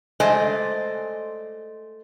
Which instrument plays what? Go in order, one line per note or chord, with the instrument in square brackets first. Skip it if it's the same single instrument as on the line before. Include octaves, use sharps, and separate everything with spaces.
[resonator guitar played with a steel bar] G#3 A3 C5 D5 D#5 G#5